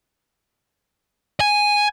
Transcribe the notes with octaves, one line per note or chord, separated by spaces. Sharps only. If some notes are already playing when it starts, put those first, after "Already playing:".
G#5